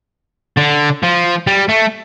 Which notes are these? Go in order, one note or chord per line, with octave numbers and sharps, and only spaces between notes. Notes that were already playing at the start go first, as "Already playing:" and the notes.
D3
F3
G3
A3